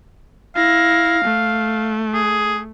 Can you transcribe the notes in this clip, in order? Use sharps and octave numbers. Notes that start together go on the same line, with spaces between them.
E4 F5 A#6
A3
G#4